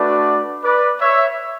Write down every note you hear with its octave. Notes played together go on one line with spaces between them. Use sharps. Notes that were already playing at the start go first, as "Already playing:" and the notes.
Already playing: A3 D4 F#4 B4 D5
B4 D5
C#5 E5